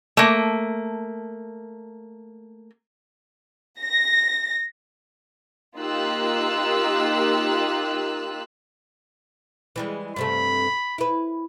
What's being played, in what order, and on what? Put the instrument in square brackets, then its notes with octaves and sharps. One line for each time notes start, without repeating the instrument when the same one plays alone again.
[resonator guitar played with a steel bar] A3 A#3
[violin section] A#6
A#3 D#4 F4 G4 E6 F#6
[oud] E3 G3 G#3
[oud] G2 C3 A3 [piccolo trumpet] B5
[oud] E4 B4